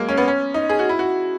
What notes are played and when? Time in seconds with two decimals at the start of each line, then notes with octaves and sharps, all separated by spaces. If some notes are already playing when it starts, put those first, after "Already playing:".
Already playing: F#3 G#3 A#3
0.09 C#4
0.17 B3
0.28 C#4
0.54 D#4
0.70 G#4
0.79 F#4
0.89 E4
0.99 F#4